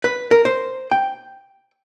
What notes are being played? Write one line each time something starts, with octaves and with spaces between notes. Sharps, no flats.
B4
A#4
C5
G5